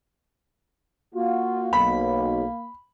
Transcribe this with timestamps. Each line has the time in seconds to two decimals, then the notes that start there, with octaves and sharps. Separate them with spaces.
1.15 A#3 F4 F#4
1.73 B1 B5